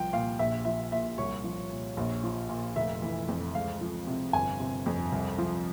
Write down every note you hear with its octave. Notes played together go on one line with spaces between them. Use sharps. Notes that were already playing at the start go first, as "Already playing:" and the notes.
Already playing: C2 F3 G5
A#2 F5
A#1 E5
F3 E5
A#2 E5
C2 C#5
F3
A#2
A#1
F3
A#2
F1 E5
E3
F2
C#2 F5
F3
C3
G1 G#5
C3
F2
C2
F3